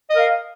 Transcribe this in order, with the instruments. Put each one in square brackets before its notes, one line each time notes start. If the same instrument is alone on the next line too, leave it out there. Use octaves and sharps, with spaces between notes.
[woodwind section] D#5
A#4
F5